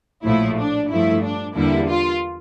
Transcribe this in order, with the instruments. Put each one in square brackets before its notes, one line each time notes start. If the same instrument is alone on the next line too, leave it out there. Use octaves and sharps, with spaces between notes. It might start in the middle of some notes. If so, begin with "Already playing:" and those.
[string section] A#1 A2 F3 A3 E4
D4
G2 F3 A3 E4
D4
E2 D3 G3 A#3 E4
F4